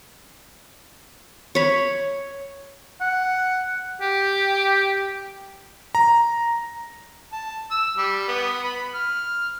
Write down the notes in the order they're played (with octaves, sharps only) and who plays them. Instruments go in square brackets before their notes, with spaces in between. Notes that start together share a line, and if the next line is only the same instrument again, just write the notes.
[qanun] C#5 B5
[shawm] F#5
G4
[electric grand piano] A#5
[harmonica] A5
E6
G3
B3
B5
F6